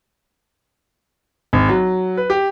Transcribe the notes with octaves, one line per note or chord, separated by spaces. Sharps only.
G#1
F#3
B4
G4